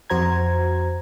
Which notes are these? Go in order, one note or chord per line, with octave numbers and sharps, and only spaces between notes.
F2 F#4 C5 A#5 G#6